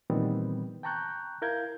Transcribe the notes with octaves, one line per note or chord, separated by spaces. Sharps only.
A#2 D#3 E3 G3 B3 C4
G5 A5 A#5 C#6 F#6 G6
E4 A#4 F5 G6 G#6